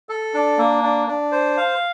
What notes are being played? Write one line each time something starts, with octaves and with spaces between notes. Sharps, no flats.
A4
D4
A#3
D4
D4
C5
F5